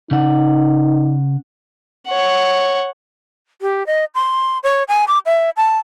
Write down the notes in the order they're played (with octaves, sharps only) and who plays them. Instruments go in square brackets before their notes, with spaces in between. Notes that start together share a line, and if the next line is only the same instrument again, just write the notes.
[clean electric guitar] C#3 F#5 [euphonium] D#4
[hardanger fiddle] C#5 F#5
[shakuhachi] G4
D#5
C6
C#5
G#5
D6
E5
A5